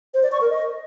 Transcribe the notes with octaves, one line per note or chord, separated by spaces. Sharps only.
C5
D5
C#6
A#4
D#5